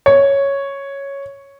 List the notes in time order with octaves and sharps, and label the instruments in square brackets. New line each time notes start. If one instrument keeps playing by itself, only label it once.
[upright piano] C#5